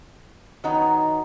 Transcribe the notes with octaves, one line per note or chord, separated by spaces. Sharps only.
D#3 F#3 B3 D#4 F#4